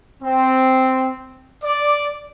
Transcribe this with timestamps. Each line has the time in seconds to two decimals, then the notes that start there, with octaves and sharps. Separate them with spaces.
0.23 C4
1.63 D5